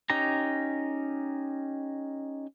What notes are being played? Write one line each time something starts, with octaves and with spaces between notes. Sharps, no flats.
C#4 D#4 G4 A#5